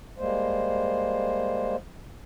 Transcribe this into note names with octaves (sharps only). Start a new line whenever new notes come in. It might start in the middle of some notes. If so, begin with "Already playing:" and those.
G3 G#3 A#3 C5